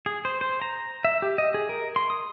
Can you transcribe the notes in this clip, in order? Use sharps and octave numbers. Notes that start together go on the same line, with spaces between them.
G#4
C5
C5
A#5
E5
G4
D#5
G#4
A#4
C6
D#6